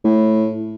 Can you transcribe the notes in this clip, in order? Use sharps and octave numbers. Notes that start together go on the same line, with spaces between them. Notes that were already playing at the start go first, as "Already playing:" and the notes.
A2